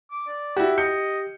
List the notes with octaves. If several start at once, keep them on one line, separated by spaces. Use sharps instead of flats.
D6
D5
E4 F#4 G4
D#5 G6 C#7